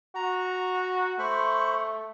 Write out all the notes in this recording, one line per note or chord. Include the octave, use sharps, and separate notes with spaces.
F#4 A#5
A3 C5 B5 C#6